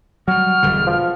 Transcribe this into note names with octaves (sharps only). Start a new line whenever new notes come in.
F#3 G3 F#4 F6
E1 D3 G3
F3